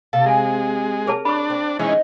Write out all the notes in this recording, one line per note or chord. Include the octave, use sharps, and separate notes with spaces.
C3 A4 F5
G#3 E5 G#5
G#4 A#4 C#5 A5
D4 B5 C#6
C4
E3 G#3 C#4 D#4